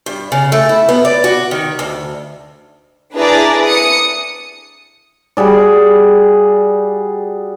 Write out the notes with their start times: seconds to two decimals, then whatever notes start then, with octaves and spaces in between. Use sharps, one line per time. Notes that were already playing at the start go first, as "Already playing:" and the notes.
0.06 G2
0.32 C#3
0.52 A3
0.69 E4
0.89 B3
1.05 D5
1.24 F#4
1.51 D#3
1.79 D2
3.15 D4 E4 G#4 B4 D5 A#5
3.64 D#6 C#7
5.37 G3 F#4 G#4 D5